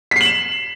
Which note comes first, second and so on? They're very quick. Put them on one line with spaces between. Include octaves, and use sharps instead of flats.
B6 C7 F#7 E7